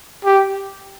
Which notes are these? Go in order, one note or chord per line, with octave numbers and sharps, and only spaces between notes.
G4